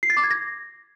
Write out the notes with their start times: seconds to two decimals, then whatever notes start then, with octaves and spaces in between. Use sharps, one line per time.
0.03 C7
0.10 A6
0.17 D6
0.24 G#6
0.31 A#6